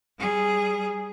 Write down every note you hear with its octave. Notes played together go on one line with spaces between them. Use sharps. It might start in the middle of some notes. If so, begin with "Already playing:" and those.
G3 G#4